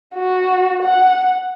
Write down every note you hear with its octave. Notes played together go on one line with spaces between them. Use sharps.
F#4
F#5